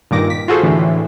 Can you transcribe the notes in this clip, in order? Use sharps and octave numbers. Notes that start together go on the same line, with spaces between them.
G2 A#2 D#3 D6 A#6
B6
F4 F#4 G#4 A4 C5
A2 D3 E3